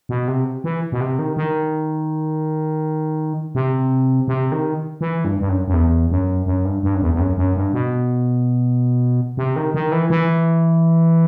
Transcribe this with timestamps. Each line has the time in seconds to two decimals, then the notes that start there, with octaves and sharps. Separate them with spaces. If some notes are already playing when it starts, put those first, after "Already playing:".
0.09 B2
0.28 C3
0.64 E3
0.92 B2
1.00 C3
1.19 D#3
1.37 D#3
3.55 C3
4.28 C3
4.52 D#3
5.01 E3
5.25 G2
5.40 G2
5.49 F#2
5.68 F#2
5.73 E2
6.11 F#2
6.46 F#2
6.65 G2
6.83 G2
6.95 F#2
7.02 E2
7.14 E2
7.19 F#2
7.37 F#2
7.56 G2
7.73 B2
9.37 C3
9.56 D#3
9.74 D#3
9.92 E3
10.10 E3